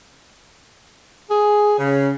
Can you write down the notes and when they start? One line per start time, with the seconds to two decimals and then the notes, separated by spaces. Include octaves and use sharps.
1.29 G#4
1.79 C#3